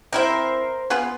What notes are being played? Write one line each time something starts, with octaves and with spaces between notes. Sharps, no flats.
C4 E4 A#4 C5 E5
B3 F4 G#4